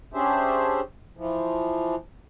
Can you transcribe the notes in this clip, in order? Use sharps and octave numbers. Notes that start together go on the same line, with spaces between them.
C#4 D4 G4 G#4 C5 E5
E3 F3